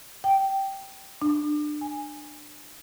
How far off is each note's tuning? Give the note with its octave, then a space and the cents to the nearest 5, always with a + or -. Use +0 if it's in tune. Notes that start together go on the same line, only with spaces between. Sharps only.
G5 -10
D4 +25
G#5 -15